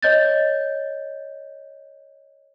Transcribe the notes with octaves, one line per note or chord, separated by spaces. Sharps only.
C#5 D#5 G6 A6